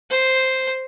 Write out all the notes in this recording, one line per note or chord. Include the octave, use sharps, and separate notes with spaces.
C5